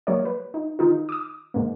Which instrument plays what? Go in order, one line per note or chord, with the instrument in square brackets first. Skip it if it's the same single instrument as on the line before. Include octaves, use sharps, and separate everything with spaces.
[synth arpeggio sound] F#3 A#3 A#4 C#5 D5
B4
D#4
D#3 D#4 F4
D6 D#6
G#2 A#3